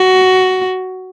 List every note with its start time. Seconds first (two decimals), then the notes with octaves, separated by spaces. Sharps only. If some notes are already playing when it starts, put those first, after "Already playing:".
Already playing: F#4